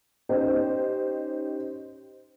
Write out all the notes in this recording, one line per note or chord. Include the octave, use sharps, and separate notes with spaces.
C#4 D#4 G4 C5 D#5